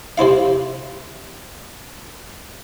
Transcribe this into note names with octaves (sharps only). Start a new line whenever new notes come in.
C3 C4 E4 F5